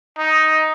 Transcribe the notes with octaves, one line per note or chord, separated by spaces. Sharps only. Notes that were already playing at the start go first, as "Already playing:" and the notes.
D#4